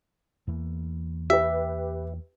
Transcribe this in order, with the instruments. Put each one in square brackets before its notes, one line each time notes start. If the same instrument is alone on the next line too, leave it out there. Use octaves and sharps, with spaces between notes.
[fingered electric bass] E2 E3 A#3
[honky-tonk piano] G4 B4 [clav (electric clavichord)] E5